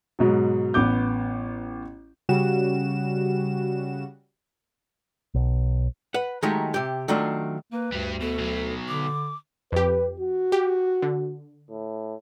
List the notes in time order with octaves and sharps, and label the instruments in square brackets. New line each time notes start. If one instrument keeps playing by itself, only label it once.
[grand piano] G#2 B2 F#3
A1 B3 D6 G6
[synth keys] C#3 G3 F#4 E7
[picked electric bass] B1
[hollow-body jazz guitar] B4 F#5
D#3 F#3 G#3 A3 D#4 G4
C3 G4
D#3 F#3 A3 D4 F4
[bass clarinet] A#3 [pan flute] B4
[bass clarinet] D2 [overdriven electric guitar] G2 G3
[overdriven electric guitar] B2 [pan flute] A4
[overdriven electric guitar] B2 F#3
[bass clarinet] D3 [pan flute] D6
[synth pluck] F2 G4 [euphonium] B4
[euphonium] F#4
[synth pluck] G4
D3
[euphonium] A2